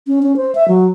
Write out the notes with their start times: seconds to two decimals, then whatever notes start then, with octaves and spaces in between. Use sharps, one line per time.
0.07 C#4
0.23 C#4
0.36 C5
0.55 E5
0.68 F#3